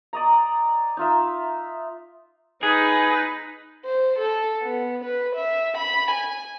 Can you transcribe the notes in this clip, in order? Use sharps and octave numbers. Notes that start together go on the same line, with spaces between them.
D5 D#5 A#5
D#4 F4 E5
D#4 G#4 B4
C5
A4
B3
B4
E5
B5
G#5